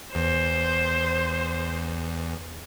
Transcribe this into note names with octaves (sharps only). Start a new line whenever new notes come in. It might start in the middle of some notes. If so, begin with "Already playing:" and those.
E2 C5